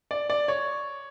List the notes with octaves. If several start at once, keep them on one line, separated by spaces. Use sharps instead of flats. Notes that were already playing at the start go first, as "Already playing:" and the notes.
D5
D5
C#5